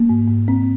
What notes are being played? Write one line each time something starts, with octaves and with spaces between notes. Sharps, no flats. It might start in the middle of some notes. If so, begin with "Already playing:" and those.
Already playing: A#3
G#2
G#2
G#2 C4